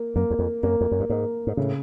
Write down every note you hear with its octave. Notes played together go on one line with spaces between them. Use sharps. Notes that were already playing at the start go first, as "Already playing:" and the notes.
Already playing: A#3
F#2 A#3
E2
F2
F#2 A#3
F2
F#2
G2
G#2 A#3
G#2
A2 C#3